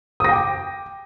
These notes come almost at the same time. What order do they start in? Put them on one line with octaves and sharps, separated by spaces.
D#6 A#6 G5 D6